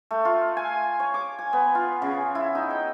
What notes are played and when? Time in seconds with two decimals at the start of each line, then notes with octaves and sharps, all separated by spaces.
0.11 A3
0.25 F4
0.57 G#5
1.00 C#5
1.14 D6
1.39 G#5
1.53 B3
1.75 F4
2.02 C#3
2.35 E4
2.55 D#4
2.70 G5